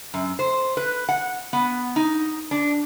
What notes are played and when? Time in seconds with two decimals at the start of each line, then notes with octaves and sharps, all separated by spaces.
0.14 F#2
0.39 C5
0.77 B4
1.09 F#5
1.53 B3
1.96 D#4
2.51 D4